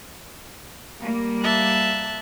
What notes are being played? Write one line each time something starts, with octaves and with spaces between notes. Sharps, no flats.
G3 A#3
E5 A5 F#6